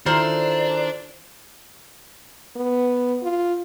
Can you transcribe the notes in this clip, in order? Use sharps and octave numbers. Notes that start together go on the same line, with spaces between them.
D#3 D4 E4 F4 A4 A#4 C5 C6
B3
F4